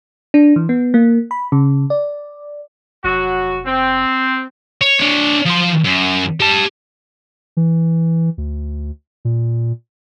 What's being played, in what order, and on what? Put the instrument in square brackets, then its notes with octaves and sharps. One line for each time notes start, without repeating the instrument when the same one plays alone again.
[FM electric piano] D4
E3
B3
A#3
B5
C#3
D5
[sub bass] F1 [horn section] F#3 F#4
[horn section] C4
[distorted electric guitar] C#5
D4 C#5
F3 C6
F#2
G4 A5
[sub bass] E3
D2
A#2